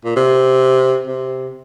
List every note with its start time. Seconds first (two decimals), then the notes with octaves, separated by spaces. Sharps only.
0.05 A#2
0.16 C3
1.07 C3